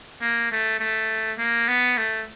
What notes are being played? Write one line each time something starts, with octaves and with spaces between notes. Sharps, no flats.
A#3
A3
A3
A#3
B3
A3